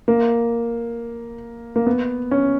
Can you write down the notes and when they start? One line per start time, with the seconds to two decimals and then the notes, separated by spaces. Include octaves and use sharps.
0.08 A#3
1.76 A#3
1.86 B3
2.31 C#4